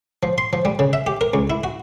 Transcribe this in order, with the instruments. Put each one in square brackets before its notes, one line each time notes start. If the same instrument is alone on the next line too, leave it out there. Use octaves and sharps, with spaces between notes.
[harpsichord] F3
C6
F3
G3
C#3
E5
G4
A#4
C#2
E4
F#4